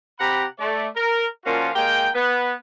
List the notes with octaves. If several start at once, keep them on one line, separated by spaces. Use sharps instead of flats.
C3 G4 F#5 A#5 B5
A3 D5
A#4
A#2 F3 A#3 C#4 F4 F#4
G#3 A#3 A#4 G5
B3 B4